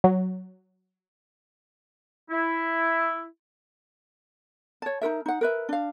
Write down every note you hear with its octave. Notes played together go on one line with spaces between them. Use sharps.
F#3
E4
C#5 A5
D#4 F#4 A#4 E5
D#4 F#5
A#4 B4 E5
D4 F5